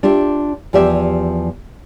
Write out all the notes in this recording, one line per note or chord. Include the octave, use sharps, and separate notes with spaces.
D4 F4 G4 E5
E2 F3 G4 D5 E5